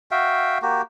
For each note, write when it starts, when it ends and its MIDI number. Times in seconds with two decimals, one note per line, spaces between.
0.11 0.58 66
0.11 0.58 76
0.11 0.58 77
0.11 0.58 79
0.62 0.82 58
0.62 0.82 66
0.62 0.82 67